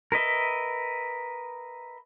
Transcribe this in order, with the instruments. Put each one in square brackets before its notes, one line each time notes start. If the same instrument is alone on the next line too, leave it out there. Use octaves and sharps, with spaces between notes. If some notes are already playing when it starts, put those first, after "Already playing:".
[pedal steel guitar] A#4 B4 D#5 E5